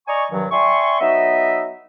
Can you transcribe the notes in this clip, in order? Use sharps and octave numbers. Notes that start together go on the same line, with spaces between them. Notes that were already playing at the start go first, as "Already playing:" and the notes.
D5 D#5 G#5 A#5 C#6
G2 C3 D#3 F#3
D5 E5 G5 G#5 C6 C#6
F#3 B3 D#4 D#5 E5